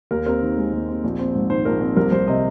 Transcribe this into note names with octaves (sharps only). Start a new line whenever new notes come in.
D#2 A#4
C4 A#4
D#3
G#3
D#2
C4
A#1
C4
G#2
D#3 C5
A#1 A#4
C4
C2 A#4
C2 C5
C3 D#5